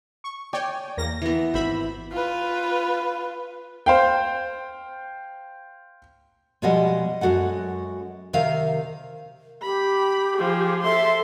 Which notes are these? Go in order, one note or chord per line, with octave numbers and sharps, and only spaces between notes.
C#6
C#5 D5 G5 G#5
E2 A#3 A#6
E3 B3
G#1 C5 E5 B5
F4 B4
C5 F5 G5
B2 F3 G3 G#3 D#5 F#5
F#2 G#3 F#4 A4 F#5
C3 D#3 A#4 E5 F5
G4 B5
F3 G#4
A4 E5 C6